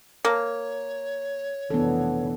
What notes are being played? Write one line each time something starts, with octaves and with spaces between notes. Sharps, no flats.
A#3 C#5
F1 E3 B3 D4 A4